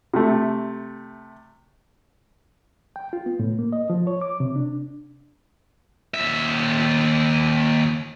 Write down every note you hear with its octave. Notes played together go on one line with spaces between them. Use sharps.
C3 A3
G5
F4
B3
A2
A#3
D#5
F3
C#5
D6
C3
D4
D#2 E5